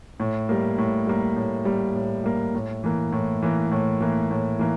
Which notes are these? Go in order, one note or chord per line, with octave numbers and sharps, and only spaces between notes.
A2
G3 A#3
A2
G3 A#3
A2
G3 A#3
A2
G3 A#3
A2
E3 A#3
A2
E3 A#3
A2
E3 A#3
A2
E3 A#3